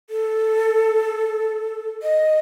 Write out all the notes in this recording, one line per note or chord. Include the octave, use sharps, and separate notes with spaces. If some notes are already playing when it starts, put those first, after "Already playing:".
A4
D#5